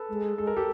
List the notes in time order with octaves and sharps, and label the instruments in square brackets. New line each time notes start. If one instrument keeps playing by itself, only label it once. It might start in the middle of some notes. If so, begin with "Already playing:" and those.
Already playing: [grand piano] A4 B4
[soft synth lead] G#3
[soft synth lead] G#3 [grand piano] A4
[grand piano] A#4
G4 A4